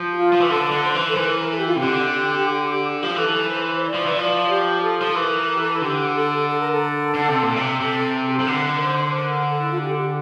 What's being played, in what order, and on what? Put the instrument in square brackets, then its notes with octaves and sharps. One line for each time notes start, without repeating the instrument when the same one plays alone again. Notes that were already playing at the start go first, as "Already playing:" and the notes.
Already playing: [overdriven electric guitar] F3
[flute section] G4
F4
[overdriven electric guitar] F3
E3
[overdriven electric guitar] D3 [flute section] A4
[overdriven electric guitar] D3
[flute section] C5
[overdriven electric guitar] E3
[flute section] A4
[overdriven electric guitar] E3 [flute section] A#4
[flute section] A4
G4
F4
[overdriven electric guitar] C3 [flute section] G4
[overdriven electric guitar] D3
F3
[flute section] G4
[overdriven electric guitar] E3 [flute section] A4
[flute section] C5
D5
[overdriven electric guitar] F3
E3
[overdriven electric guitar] F3 [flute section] D5
[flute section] G4
A4
[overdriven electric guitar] F3
[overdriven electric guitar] E3 [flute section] A#4
[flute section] A#4
G4
A4
[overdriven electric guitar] D3 [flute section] G4
[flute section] A4
A4
A#4
A4
[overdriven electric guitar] D3
C3
A#2
C3
[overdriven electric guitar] C3 [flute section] A4
[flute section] G4
[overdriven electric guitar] C3 [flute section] A4
[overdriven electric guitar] D3 [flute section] A#4
[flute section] C5
A#4
A4
E4
F4
G4
A4
G4